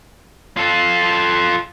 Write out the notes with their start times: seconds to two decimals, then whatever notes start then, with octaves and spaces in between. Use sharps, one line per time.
0.57 F4 A4